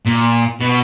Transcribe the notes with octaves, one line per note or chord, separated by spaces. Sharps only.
A#2
B2